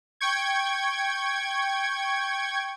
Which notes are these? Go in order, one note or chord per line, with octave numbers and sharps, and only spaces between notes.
G5 C#6 G#6